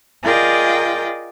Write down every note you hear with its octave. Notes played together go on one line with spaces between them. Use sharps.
F4 G#4 A#4 D5 D#5 G5